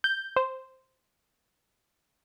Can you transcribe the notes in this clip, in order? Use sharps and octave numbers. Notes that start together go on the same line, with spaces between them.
G6
C5